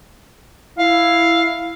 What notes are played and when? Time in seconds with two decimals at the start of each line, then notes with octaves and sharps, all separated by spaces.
0.79 E4 F5